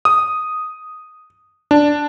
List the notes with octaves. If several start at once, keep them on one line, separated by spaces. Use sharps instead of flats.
D#6
D4